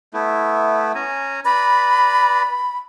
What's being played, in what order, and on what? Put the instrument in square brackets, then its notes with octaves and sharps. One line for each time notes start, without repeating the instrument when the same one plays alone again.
[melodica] A3 B3 E4
C#4 G#5 A#5
[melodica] B4 D5 A#5 [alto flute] B5